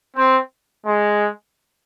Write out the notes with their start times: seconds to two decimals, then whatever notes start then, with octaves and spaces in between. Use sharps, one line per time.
0.16 C4
0.86 G#3